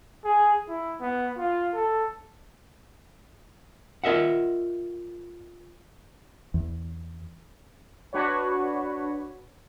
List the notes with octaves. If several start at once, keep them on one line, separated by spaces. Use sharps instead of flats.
G#4
E4
B3
F4
A4
F4 A#4 D#5 E5 F#5
E2
D4 F#4 B4 C#5